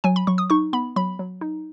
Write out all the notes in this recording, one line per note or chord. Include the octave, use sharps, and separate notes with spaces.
F#3 G#5
B5
F#3 C#6
D#6
D#4 C#6
B3 B5
F#3 B5
F#3
D#4